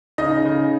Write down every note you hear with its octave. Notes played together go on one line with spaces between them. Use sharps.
C#3 D#4 D#5
C#3